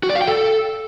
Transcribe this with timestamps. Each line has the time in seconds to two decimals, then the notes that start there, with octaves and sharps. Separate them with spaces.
0.03 F#4
0.09 D5
0.15 F5
0.21 G5
0.27 A4